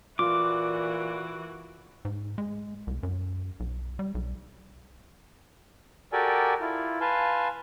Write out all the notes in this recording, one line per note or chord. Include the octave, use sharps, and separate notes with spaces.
A#2 E3 F4 F#4 D6
G#2
G#3
C2
F#2
B1
G3
B1
F#4 G4 A4 A#4 D5 G#5
E4 F4
B4 F5 G#5 A5 C6